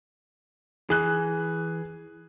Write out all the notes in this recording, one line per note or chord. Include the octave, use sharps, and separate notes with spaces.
E3 G#4 F#6